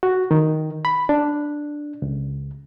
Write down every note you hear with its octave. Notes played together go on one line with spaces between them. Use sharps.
F#4
D#3
B5
D4
C#2